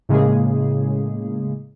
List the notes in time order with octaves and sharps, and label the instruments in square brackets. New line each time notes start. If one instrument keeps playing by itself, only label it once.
[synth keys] A2 C#3 G#3 A#3 G#4